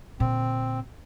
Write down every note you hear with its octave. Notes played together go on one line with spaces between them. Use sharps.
A#2 D3 C4